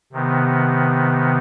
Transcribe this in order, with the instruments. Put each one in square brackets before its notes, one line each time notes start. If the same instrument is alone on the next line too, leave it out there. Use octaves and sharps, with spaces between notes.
[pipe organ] C3 D#3 B3